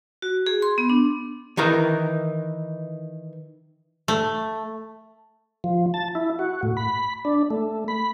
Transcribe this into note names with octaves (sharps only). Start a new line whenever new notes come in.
F#4
G#4
C6
B3
D4
D#3 E3 D#4 A#4
A3
F3
A5
E4
F#4
A2
B5
D4
A3
B5